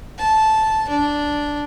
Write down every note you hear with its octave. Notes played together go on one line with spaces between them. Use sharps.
A5
D4